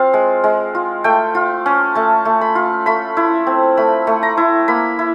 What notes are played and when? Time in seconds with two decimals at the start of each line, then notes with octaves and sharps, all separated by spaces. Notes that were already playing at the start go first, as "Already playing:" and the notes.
Already playing: C4 F4 F5
0.14 G#3
0.44 G#3
0.75 F4
1.04 A3 G5
1.35 F4
1.66 C#4
1.95 A3 A5
2.25 A3
2.41 B5
2.55 F4
2.86 A3 B5
3.17 E4
3.47 C4
3.77 A3 B5
4.07 A3
4.23 A#5
4.37 E4
4.68 A#3 B5
4.99 E4